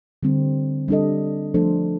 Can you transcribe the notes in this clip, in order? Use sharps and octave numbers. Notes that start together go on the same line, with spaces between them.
D3 G3 C4
G3 D4 A4 D#5
F3 A3 D4 A4 C5